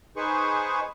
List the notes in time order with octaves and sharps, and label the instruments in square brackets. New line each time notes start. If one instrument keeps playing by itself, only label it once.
[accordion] D#4 G#4 B4 C5 C#6